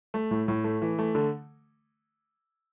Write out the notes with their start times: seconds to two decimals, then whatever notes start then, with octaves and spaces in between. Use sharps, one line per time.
0.14 A3
0.31 A2
0.48 A2
0.64 A3
0.82 E3
0.99 A3
1.15 D3